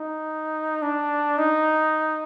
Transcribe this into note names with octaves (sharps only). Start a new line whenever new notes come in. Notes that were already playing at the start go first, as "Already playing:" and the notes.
Already playing: D#4
D4
D#4